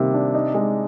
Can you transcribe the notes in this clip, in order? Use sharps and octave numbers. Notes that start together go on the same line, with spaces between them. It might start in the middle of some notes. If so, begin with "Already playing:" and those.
Already playing: C3 D#3 G3 A#3
D4
D#4
G#3